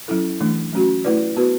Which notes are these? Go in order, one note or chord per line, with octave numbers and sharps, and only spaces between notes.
F#3 C#4 E4 A4
E3 A3 D4
F#3 A3 C#4 F#4
A3 E4 B4 D5
B3 F#4 B4